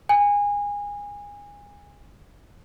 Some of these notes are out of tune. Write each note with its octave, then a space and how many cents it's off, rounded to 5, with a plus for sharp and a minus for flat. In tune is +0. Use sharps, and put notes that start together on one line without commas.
G#5 -25